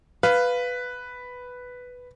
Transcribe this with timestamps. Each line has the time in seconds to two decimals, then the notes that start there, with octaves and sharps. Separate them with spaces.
0.23 B4 F5